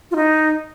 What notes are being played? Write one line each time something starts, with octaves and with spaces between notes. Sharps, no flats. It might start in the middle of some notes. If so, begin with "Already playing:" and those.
F4
D#4